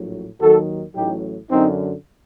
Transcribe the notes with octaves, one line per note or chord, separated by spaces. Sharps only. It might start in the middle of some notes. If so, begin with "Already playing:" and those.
Already playing: A#1 A2 F#3
D#2 D#3 F#3 F#4 A4
A1 A2 F#3 D#4 G4
F#2 D3 F#3 C4 D#4